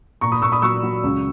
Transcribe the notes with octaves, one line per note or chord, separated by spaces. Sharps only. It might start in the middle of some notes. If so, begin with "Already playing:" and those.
A#2 A#5 C#6
B5 D#6
A#2 C#6 E6
B5 D#6
F#3 C#6 E6
F#3
C#2